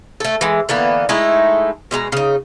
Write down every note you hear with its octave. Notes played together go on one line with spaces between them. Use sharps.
A3 A4
E3 G#3
D3 E3 A#3 B3
G#3 A3 D#4 E4
B2 G#3 F#4 A#5
C#3 D#4